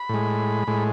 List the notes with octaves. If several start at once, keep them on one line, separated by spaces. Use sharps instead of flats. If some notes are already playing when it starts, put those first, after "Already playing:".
Already playing: B5
A2 G#3
A2 G#3